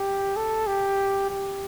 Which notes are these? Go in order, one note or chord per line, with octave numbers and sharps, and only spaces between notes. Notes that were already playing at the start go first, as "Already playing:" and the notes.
Already playing: G4
A4
G4
G4